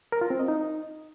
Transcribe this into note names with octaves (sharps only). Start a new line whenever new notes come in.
A#4
F4
C4
D#5
D#4